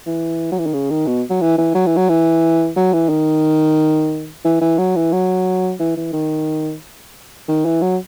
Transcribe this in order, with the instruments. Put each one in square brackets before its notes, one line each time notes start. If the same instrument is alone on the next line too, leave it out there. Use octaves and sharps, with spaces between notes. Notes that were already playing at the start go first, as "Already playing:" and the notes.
[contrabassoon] E3
F#3
E3
D#3
C#3
D#3
B2
F#3
E3
E3
F#3
E3
F#3
E3
F#3
E3
D#3
E3
E3
F#3
E3
F#3
E3
E3
D#3
D#3
E3
F#3